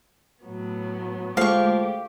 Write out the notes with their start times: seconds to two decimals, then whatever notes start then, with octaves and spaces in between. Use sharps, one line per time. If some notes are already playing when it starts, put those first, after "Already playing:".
0.44 A2 F#3 B3
1.37 D2 F3 G#3 A3 G4 F5 C#6 D6